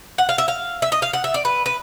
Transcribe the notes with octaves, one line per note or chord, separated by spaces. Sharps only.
F#5
F5
E5
F5
E5
D#5
F5
F#5
E5
D5
B4
B4